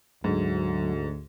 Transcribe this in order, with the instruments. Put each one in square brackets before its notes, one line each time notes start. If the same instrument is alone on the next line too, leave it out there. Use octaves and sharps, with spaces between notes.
[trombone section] D2 [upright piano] G#2 [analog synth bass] F#3